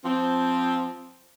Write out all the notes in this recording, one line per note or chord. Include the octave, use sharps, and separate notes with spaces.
F3 C4